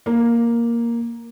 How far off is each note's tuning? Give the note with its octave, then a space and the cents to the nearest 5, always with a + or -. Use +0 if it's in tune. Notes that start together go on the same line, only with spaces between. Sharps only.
A#3 +5